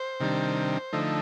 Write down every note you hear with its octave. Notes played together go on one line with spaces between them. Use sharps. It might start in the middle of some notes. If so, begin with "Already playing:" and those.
Already playing: C5
C3 D#3 G3 D4
D3 F3 A3 D#4